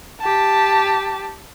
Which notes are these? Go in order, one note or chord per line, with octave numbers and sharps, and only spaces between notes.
G4 A5